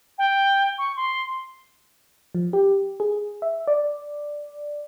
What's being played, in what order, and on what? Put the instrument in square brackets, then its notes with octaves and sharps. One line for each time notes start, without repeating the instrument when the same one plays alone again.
[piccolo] G5
C#6
C6
[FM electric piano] F3
G4
G#4
E5
D5